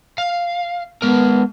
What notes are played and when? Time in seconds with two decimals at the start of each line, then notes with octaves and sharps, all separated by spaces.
0.18 F5
1.02 G#3 B3 A#4